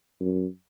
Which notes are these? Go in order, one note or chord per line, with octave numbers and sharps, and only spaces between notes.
F#2